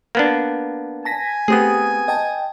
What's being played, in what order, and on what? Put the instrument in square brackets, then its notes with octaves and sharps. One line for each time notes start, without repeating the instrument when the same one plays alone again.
[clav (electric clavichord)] A#3 B3 D4
[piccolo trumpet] G#5 [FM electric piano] A5 A#6 B6
[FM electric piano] A3 G4 D#6 [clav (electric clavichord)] B3 C4 G#4
[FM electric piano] D#5 G5 A5